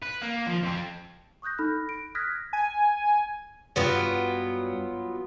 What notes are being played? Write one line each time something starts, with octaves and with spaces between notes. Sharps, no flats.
B4
A#3
F3
F2 C4
C#6 D#6 F#6 G6 A#6
D#4 A4 B5 F6 F#6 A#6
D7
D#6 F6 F#6 G#6 A#6 B6
G#5
G2 F#3 B3 F4